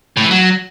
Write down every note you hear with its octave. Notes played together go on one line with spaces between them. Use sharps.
A2
E3
F#3